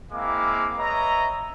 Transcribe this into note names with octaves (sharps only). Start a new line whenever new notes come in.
G#3 A#3 C4 E4 F5 D6
B4 C#5 D#5 E5 A#5